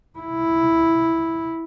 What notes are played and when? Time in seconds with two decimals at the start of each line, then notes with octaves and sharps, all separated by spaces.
0.19 E4